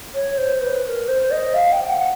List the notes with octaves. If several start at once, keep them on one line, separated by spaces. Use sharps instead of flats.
C#5
C5
B4
B4
A#4
C5
D#5
F5
G5
F#5